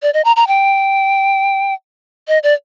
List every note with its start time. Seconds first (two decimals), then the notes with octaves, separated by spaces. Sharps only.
0.02 D5
0.14 D#5
0.25 A#5
0.36 A#5
0.48 G5
2.28 D#5
2.43 D5